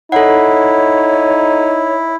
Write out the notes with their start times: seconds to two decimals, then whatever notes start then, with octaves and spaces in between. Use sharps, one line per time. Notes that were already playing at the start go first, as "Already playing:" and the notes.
0.12 D#4 E4 A4 C#5 F#5